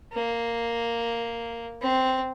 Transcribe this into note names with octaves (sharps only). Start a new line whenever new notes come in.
A#3
C4